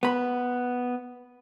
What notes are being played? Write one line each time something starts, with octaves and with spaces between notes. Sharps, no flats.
B3 B5